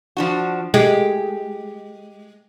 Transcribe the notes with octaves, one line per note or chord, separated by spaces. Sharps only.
F3 D4 F#4
G#3 G4